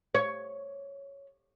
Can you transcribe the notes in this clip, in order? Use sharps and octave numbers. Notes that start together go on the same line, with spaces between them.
C#5